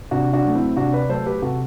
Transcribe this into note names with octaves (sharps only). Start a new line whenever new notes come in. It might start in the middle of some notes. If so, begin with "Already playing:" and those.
C3 D4 F#4
D4 F#4
F#3 A3
C4 E4
C3 D4 F#4
B4 D5
F#3 A3 A4 C5
G4 B4
C3 F#4 A4